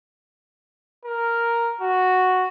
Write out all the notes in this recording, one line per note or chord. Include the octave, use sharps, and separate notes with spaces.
A#4
F#4